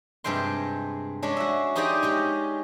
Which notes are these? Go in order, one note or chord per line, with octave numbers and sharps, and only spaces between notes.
G2 C3 G#3 G5 C6
G#3 C#4 D4
F#4 E5
D#4 G4 G#4 C5 D5 D#5
G#3 C#4 G4